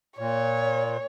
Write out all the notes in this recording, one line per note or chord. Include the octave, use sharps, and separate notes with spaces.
A#2 C#5